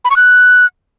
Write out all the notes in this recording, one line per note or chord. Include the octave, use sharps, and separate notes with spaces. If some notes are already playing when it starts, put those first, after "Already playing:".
B5
C#6
F#6